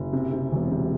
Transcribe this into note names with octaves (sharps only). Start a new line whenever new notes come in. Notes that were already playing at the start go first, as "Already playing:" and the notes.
Already playing: F#1
C3
C3
E1
C3